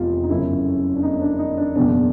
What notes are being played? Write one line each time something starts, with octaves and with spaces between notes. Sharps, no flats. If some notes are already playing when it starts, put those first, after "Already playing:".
Already playing: F1 E2 F4 G4
D#4
G1 F#2 C#3 E4
D4
D#4
D4
D#4
D4
F#1 E2 B2 D4